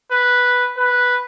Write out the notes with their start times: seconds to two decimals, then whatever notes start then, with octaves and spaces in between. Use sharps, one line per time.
0.11 B4
0.77 B4